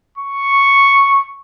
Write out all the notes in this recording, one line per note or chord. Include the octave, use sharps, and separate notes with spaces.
C#6